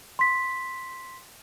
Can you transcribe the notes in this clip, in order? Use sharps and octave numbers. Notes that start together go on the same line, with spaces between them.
C6 B6